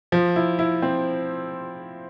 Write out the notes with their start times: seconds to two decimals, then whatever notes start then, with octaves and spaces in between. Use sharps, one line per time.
0.12 F3
0.36 E4
0.59 E4
0.82 C4